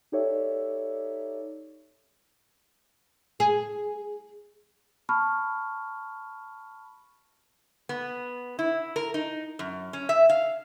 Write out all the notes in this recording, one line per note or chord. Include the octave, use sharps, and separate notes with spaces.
D#4 G4 A4 C#5 D5 E5
G#4
A5 B5 C#6 F6
B3
E4
A#4
D#4
F#2
C#4
E5
F5